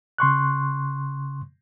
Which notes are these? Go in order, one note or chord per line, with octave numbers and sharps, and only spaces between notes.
C#3 C6 C#6 F#6